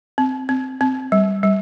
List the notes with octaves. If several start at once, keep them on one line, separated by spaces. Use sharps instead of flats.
C4
C4
C4
G3
G3